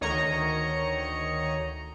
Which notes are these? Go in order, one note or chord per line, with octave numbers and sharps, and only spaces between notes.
D2 D#3 C#5 D#5 A#5 C#7